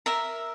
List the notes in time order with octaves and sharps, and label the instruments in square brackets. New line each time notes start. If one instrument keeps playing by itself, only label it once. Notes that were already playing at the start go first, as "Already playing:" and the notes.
[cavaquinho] A#4 E5 A#5